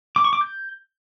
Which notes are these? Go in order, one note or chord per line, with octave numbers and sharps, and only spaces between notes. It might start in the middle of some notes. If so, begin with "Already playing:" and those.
D6
C#6
D6
G6